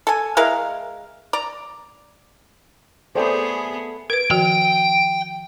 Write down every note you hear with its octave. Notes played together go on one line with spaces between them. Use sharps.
A4 G#5
G#3 E4 A#4 F5
D5 A#5
A3 B3 G#4 B4 C5 D5 G5
A#4 B4 D7
D#3 F3 F#4 G5